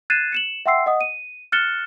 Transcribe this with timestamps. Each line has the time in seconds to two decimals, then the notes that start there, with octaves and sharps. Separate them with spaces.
0.10 F#6 G#6 A6 C7 D#7 E7
0.32 C#7 E7 F#7
0.66 E5 F#5 G5 C6 E6 C7
0.86 D#5 F#5 D#6
1.01 D#7
1.52 F6 F#6 A6 C#7 E7 G7